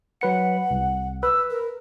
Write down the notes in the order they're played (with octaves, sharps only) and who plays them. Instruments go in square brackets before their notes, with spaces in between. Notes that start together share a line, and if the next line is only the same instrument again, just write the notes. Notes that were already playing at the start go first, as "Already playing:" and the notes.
[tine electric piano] F#3 B4 C#7 [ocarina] F#5
[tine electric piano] C2
[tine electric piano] B4 [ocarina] E6
[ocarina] A#4